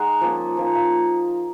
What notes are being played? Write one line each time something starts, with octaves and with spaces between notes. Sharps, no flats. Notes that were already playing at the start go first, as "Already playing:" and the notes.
Already playing: G#3 D#4 F#5
F3 A#3 C#4
F3 A#3 D#4
F5